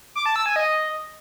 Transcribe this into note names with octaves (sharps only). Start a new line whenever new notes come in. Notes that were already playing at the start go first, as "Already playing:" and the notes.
D6
A5
E6
G#5
D#5